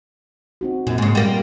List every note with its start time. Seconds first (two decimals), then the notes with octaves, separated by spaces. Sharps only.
0.61 C4 D#4 F#4
0.87 F#2 A#2
0.98 G#2 C#3
1.15 G3 A#3